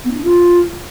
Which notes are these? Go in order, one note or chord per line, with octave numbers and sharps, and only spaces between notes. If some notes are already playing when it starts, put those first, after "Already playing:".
B3
D#4
D4
F4